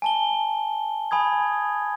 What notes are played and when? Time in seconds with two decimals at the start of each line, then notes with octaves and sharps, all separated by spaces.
0.02 G#5 A5 G7
1.11 G#5 B5 D#6 G#6